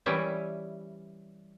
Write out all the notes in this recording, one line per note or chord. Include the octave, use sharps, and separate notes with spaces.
E3 G3 C#4 E5